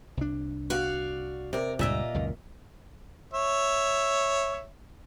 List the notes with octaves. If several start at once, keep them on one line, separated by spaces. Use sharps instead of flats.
C2 D4
F#4 D5 F5
C3 A#4 D5
C#2 G2 A#2 A#3 F4 D#5 E5
C#2 F#2 D#3
C#5 E5